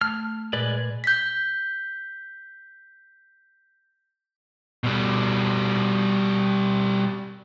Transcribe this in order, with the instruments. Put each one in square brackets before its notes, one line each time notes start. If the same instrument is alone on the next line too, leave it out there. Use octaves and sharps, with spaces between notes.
[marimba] A3 [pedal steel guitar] F6
[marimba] A#2 [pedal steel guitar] G#3 B4 D5
[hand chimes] G6 B6
[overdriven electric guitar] B2 G3